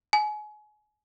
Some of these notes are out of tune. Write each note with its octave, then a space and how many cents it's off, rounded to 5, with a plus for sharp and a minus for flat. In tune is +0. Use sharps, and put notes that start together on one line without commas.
G#5 +30